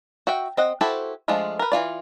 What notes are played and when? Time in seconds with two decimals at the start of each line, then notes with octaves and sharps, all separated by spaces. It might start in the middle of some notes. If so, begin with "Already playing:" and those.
0.27 F#4 E5 G5
0.57 C4 D#5 F#5
0.81 E4 F#4 G4 A4 C5
1.28 F3 G#3 A3 D4 F4
1.59 A#4 B4
1.72 E3 F3 F4 D5